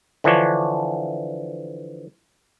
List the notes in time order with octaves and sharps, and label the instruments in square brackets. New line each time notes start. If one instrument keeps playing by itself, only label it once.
[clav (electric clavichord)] D3 E3 F3 D4 C#5